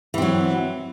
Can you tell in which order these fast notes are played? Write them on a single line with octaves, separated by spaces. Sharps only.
E3 C4 F#3